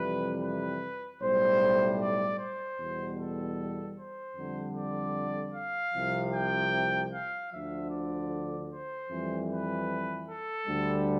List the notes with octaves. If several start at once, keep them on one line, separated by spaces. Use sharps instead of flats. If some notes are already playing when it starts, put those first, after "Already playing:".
Already playing: F2 C3 E3 G3 B4
B4
B1 A2 G3 C5
D5
C5
E2 B2 G3
A4
C5
F2 D3 G3
D5
F5
C2 C3 F3
G5
F5
D2 D3 F3 E5
D5
C5
F2 E3 G3
B4
A4
D2 D3 G3